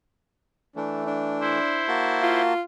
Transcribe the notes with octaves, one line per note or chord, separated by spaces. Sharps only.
E3 A3 D4
D4
E4 C5
A#3 F#4 A5
F4